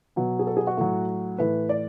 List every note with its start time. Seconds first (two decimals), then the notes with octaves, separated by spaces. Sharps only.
0.16 B2 F#3
0.39 G#4
0.47 A4
0.57 G#4
0.67 F#4
0.77 A2 F#3
1.38 A2 E3 B4
1.69 D5